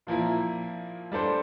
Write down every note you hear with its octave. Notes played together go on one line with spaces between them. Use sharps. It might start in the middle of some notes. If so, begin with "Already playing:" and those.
A#2 F3 A#3 E4
G3 D4 A4 C5